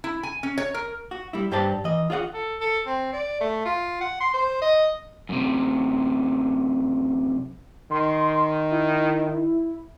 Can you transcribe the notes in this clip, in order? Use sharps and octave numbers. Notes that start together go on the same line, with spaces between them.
E4
G#5
C#4
C#5
A#4
F#4
G3 E4
G2 G4 C5 D5 A5
E3 D#5
F4 G#4 D5 F#5
A4
A4
C4
D5
A3
F4
F#5
C6
C5
D#5
F#2 C3
D#3 C6
E4